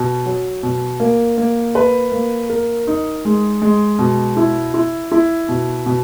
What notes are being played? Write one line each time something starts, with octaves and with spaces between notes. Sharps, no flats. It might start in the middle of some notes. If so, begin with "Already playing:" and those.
Already playing: B2
F#3
B2
A#3
A#3
B4
A#3
A#4
D#4
G#3
G#3
B2
E4
E4
E4
B2
B2